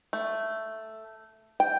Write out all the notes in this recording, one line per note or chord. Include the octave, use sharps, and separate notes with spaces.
A3
G5